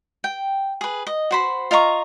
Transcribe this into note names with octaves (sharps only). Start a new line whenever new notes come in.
G5
G#4 B4
D#5
F#4 C5 B5
F4 D#5 A#5 C#6